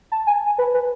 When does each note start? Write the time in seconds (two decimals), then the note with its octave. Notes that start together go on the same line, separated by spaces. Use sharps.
0.12 A5
0.27 G#5
0.58 B4
0.74 B4